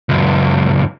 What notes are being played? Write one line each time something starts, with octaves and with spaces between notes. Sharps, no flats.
C#2 F#2